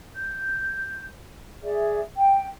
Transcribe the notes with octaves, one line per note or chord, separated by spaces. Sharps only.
G6
G#4 D5 E5
G5